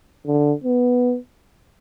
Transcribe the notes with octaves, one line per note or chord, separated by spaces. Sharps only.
D3
B3